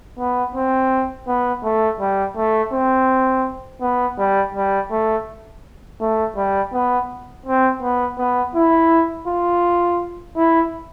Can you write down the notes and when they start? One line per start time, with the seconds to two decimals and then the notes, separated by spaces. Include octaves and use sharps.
0.19 B3
0.55 C4
1.27 B3
1.64 A3
2.00 G3
2.37 A3
2.73 C4
3.81 B3
4.18 G3
4.55 G3
4.91 A3
6.01 A3
6.36 G3
6.73 B3
7.46 C4
7.82 B3
8.18 B3
8.55 E4
9.28 F4
10.36 E4